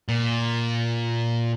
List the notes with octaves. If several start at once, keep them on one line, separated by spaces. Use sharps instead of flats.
A#2